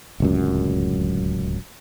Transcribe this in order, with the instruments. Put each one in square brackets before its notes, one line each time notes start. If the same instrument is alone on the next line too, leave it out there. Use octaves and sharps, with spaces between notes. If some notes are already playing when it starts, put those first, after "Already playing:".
[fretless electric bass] D1 C#2 F#2